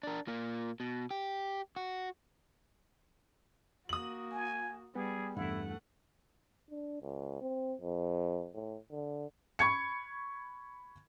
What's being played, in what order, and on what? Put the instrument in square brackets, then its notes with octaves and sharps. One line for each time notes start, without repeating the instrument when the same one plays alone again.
[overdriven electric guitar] D4 A#4
A#2 A#3
B2
G4
F#4
[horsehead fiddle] A#3 F#4 [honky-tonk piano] D#6 F#7
[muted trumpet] G#5
[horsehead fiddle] G3 [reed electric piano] B3 [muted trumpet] G#4
[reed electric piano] E2 G2 [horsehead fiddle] A3 F#5 [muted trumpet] E4
[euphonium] D4
C#2
C4
F2
A2
D3
[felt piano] B5 C#6 G#6 C#7